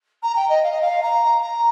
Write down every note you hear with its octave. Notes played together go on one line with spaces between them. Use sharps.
A#5
G5
D#5
F5
D#5
F5
A#5
A#5